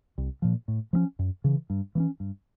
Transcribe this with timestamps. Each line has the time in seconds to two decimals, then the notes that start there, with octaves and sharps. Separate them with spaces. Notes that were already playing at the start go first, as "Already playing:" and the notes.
0.18 C2
0.42 A#2 F3
0.68 A2
0.93 F3 G#3 C#4
1.19 F#2
1.44 C#3 E3
1.70 G2
1.95 E3 A3
2.00 C#4
2.20 G2